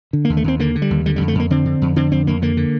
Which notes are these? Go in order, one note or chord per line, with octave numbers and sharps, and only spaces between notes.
D3
D#2 A#3
A3
D#2 C4
D3 A#3
D3
G3
D#2
D3 G3
F2 G3
A3
F2 A#3
D3 C4
D3
F2
D3 C4
F2 C4
F2 A#3
D3 A#3
D3